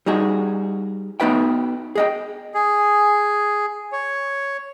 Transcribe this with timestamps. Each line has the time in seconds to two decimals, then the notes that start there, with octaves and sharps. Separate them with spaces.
0.06 G3 D#4 F#4 G#4
1.20 B3 D#4 F#4 B4 E5 G5
1.95 G#4 D#5 G5
2.54 G#4
3.92 C#5